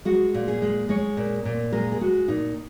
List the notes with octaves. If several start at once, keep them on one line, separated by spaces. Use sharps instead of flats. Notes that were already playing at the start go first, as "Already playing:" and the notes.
G#3 F#4
A#2
G#4
G#3
G#3 C#5
A#2
A#2
G#3 A#4
G#4
G#3 F#4
A#2 D#4